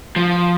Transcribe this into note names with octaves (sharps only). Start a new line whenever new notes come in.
F3